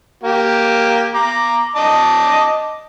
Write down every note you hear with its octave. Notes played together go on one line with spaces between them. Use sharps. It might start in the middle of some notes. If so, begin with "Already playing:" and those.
A#3 G4
A#5 D6
D#5 A5 D6